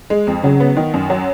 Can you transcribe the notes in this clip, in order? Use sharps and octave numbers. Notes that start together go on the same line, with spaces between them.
G#3
F2
C#3 F#3
B3
D#3
F#2
F#3